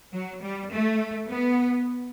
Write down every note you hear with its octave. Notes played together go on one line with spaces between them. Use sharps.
F#3
G3
A3
B3